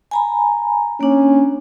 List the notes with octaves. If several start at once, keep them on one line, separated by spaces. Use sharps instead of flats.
G#5 A#5 B5
A#3 C#4 D4